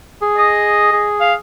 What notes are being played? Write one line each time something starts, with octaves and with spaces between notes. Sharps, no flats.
G#4
D#5
G#4
F5